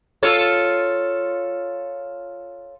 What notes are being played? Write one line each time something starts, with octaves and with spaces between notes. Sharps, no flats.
F4 A4 C#5